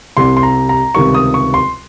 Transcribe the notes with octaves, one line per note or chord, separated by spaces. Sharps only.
C2 C3 G3 C6
C6
A#5
A#5
C#2 C3 D#3 G3 C#6
D#6
C#6
C6